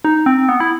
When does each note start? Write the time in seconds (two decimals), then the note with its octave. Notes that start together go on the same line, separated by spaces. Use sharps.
0.05 D#4
0.26 C4
0.49 B3
0.60 E4